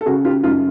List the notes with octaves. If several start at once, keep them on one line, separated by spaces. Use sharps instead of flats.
A4
C#3 F#4 G#4
F4 G4
F#2 D#4 F4